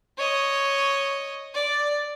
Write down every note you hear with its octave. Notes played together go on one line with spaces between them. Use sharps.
C#5 D#5
D5